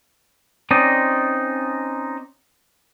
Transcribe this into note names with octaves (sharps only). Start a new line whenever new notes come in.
C4 C#4 D#4 D5 D#5